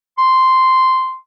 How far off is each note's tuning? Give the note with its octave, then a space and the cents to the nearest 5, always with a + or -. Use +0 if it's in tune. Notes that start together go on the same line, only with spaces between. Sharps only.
C6 -5